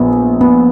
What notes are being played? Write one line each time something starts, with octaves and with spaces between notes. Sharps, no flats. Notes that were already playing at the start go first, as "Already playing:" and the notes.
Already playing: A#1 B3
B3